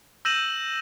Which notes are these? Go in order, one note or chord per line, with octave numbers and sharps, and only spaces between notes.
E6 G6 A#6 D#7 E7 F#7